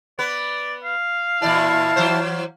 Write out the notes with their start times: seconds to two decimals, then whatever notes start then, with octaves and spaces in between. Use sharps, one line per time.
0.19 B3 B4 D5
0.83 F5
1.42 A#2 E3 E4 D5 A5
1.96 E3 F#3 C5